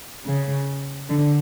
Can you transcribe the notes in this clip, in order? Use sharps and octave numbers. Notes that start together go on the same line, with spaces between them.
C#3
D3